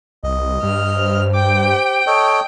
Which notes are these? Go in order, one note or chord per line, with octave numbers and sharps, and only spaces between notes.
C2 D#5
G2 F6
C5
G5 D6
G4
A4 C#5 D#5